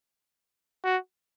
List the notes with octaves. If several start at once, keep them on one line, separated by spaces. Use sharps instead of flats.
F#4